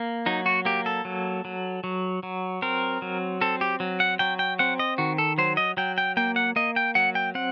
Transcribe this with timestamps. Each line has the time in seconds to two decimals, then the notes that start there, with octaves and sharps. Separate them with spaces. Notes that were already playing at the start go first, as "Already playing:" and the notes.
Already playing: A#3
0.26 F#3 D#4
0.46 F#4
0.65 A#3 G4
0.86 A4
1.05 F#3
1.45 F#3
1.84 F#3
2.23 F#3
2.62 C4 A#4
3.02 F#3
3.41 C4 A4
3.61 G4
3.80 F#3
4.00 F#5
4.19 F#3 G5
4.39 G5
4.59 C4 F#5
4.79 D#5
4.98 D#3 F#4
5.18 A4
5.38 F#3 C5
5.57 D#5
5.77 F#3 G5
5.98 G5
6.17 A#3 G5
6.36 F#5
6.56 A#3 D#5
6.76 G5
6.95 F#3 F#5
7.15 G5
7.35 C4 F#5